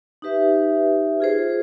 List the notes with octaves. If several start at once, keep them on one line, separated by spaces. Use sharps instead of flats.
D#4 G4 B4 E5
F4 G#4 C5